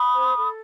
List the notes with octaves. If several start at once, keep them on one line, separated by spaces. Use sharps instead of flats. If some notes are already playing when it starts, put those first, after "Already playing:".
Already playing: B5 D#6
C5
A4